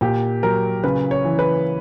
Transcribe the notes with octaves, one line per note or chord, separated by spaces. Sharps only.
A#2 G4
F#3 A#4
C#3 B4
C#5
E3
B4